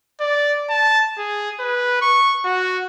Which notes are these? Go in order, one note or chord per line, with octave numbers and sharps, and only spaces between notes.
D5
A5
G#4
B4
C#6
F#4